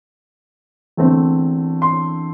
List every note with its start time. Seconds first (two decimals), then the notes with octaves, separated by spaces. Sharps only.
0.97 E2 D3 A3 C4
1.82 C6